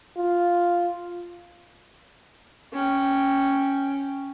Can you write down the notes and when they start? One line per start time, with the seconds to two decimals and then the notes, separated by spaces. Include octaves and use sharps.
0.17 F4
2.73 C#4 G5